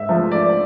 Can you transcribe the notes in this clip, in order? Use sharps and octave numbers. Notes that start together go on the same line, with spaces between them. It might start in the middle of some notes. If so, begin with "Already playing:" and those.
Already playing: G#2 E5
F3 A3
D5